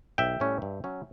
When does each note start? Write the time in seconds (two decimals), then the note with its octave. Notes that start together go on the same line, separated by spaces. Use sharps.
0.18 B1 E5 G5
0.40 A2 G3 C#4
0.62 G2
0.84 F#3 C#4